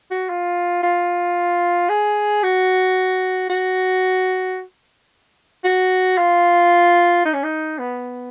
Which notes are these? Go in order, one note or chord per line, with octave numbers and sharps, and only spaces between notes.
F#4
F4
F4
G#4
F#4
F#4
F#4
F4
D#4
C#4
D#4
B3